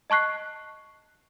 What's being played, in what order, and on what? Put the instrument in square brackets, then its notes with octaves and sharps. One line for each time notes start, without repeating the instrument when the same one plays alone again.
[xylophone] D#5 A5 C#6 F#6 C7